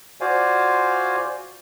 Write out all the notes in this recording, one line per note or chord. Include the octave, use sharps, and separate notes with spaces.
F4 F#4 C5 D5 F5 G#5